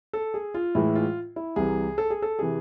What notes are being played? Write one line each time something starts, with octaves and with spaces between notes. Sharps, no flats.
A4
G#4
F4
A2 E3 G#3 E4
F4
E4
C2 C3 E3 G#4
A4
G#4
A4
C3 E3 G#4